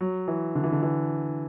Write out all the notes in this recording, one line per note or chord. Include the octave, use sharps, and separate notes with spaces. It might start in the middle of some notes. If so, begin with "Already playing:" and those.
F#3
E3
D3
E3
D3
E3